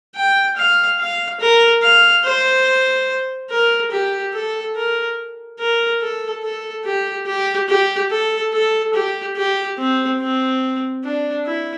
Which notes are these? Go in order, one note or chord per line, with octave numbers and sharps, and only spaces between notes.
G5
F5
F5
A#4
F5
C5
A#4
G4
A4
A#4
A#4
A4
A4
G4
G4
G4
A4
A4
G4
G4
C4
C4
D4
E4